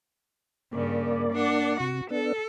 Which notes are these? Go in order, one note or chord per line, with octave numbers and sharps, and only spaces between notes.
G2 C#3 A#3 D5
D4 F#5
C3 F#4
B3 D4 A4